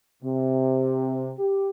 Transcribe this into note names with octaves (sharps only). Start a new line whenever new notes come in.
C3
G4